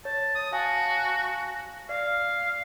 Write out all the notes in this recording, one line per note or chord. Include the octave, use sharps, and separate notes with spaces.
C#5 A5
D#6
F#4 F5 G#5 A5
D5 F5